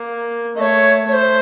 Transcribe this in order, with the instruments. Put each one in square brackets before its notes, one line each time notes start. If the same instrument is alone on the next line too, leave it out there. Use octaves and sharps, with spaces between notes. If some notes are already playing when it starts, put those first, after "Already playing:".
Already playing: [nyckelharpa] A#3
[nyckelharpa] A3 [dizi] C#5 D#5
[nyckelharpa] A3 [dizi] C#5
[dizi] C5